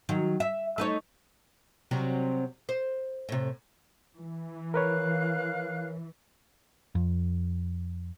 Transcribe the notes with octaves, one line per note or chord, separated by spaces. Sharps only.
D#3 F#3
E5
A3 D#4 C#5
C3 F#3 G3
C5
A2 C3
E3
A#4 B4 C#5 F5 F#6
F2